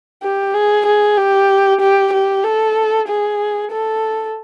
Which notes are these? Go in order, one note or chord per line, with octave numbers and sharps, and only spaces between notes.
G4
G#4
G#4
G4
G4
G4
A4
G#4
A4